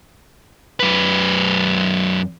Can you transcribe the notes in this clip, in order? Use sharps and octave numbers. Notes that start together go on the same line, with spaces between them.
F#2 B4